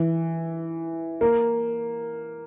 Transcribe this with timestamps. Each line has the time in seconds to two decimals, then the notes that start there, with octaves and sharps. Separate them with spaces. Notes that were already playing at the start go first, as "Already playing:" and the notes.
Already playing: E3
1.21 A#3